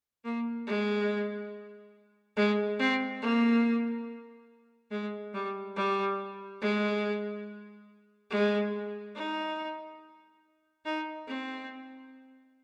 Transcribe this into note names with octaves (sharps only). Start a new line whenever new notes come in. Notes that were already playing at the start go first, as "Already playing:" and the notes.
A#3
G#3
G#3
C4
A#3
G#3
G3
G3
G#3
G#3
D#4
D#4
C4